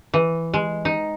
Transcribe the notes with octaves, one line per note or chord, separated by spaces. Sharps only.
E3
G#3
D#4